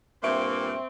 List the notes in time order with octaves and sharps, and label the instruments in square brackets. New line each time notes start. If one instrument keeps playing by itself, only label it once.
[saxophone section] G2 A#2 A#3 [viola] C4 [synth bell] E5 C#6 D7